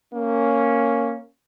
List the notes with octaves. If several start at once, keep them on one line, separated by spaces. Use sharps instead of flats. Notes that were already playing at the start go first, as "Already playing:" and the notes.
A#3 C#4